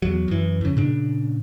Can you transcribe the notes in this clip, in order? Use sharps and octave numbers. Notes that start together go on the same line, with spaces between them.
E2 F#3
F#2 E3
F2 C#3
A#2 C#3 D4